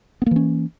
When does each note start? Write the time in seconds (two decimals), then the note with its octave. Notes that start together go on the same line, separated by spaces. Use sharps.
0.22 B3
0.26 A#3
0.31 E3
0.36 C#4